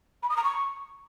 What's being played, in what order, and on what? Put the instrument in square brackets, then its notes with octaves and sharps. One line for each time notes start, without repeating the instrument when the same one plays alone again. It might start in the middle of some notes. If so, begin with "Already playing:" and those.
[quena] B5
D#6
A#5
C#6